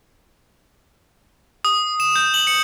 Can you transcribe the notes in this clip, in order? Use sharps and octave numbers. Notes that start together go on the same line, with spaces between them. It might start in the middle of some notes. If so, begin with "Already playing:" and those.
D#6
E7
G6
F#7
C#7